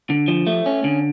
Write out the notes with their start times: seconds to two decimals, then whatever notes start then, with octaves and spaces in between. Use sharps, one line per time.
0.10 D3
0.28 F3
0.47 A3
0.66 C#4
0.84 D3